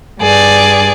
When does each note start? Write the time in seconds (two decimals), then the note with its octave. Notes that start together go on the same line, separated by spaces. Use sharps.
0.19 G2 G#4 D5